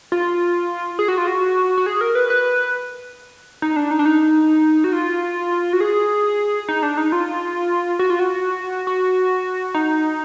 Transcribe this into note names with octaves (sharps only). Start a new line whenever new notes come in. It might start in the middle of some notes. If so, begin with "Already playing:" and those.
F4
G#4
F#4
F4
F#4
F#4
G#4
A#4
B4
B4
D#4
D4
D#4
D4
D#4
F#4
F4
F#4
G#4
D#4
D4
D#4
F4
F#4
F4
F#4
F#4
D#4